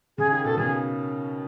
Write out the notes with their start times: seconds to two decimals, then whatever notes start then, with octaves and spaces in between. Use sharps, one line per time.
0.18 C#3 G#4
0.31 D#3 G#4
0.44 B2 A4
0.58 C#3 G#4